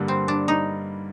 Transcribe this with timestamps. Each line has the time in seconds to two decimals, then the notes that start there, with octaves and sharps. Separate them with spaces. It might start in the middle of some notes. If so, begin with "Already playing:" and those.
Already playing: G2 D3 G3 A#3
0.08 C4
0.28 D4
0.48 D#4